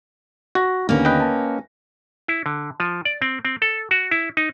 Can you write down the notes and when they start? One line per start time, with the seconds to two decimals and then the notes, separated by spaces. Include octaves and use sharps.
0.55 F#4 A#6
0.89 D#2 D3 A#3 B3 C#4
1.05 B4 D#5 G5
1.20 A5
2.28 E4
2.46 D3
2.80 F3
3.05 D5
3.22 C4
3.45 C4
3.62 A4
3.91 F#4
4.11 E4
4.37 D#4